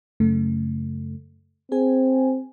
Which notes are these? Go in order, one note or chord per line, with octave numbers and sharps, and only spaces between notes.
F#2 C#3 A3
C4 G#4 G#5